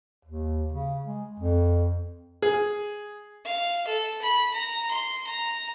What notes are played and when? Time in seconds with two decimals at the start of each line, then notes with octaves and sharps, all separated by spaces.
0.25 D#2
0.72 C#3
1.04 G#3
1.39 F2
2.42 G#4
3.45 F5
3.87 A4
4.21 B5
4.53 A#5
4.90 C6
5.26 A#5